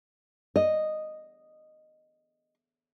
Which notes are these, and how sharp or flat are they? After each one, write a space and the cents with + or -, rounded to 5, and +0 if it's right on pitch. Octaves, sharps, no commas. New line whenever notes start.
D#5 -5